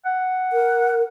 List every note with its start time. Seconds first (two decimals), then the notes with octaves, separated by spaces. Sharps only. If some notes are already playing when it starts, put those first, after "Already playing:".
0.05 F#5
0.52 A#4